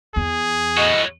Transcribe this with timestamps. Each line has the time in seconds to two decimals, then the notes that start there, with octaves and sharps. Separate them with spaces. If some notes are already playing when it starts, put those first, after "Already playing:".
0.16 E2 G#4
0.77 A2 F#4 D#5